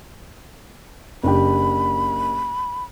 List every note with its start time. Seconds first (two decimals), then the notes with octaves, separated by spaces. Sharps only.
1.24 F#1 D4 G4 B5